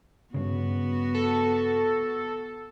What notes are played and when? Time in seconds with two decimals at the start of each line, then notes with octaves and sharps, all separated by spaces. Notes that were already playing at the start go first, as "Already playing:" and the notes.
0.34 G2 C#3 B3 F#4
1.14 A4